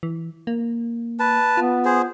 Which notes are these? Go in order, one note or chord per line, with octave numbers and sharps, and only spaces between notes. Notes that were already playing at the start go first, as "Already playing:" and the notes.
E3
A#3
B4 A5
B3 F4
G#4 C5